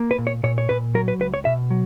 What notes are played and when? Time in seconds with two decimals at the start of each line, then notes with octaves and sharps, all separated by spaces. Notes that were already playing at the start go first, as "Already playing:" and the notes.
Already playing: A#3
0.11 B4
0.18 A#2
0.27 C#5
0.43 A#2 C#5
0.58 C#5
0.69 A#2 B4
0.94 F#3 A#4
1.08 B4
1.20 C#2 B4
1.34 C#5
1.45 B2 E5
1.71 F#3